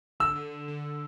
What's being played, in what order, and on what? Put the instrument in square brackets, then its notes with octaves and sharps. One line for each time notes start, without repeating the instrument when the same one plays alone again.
[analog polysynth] D3 [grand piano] E6
[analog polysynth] D3
D3
D3
D3